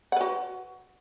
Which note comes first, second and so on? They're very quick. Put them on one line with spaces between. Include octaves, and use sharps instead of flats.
F#5 B4 F#4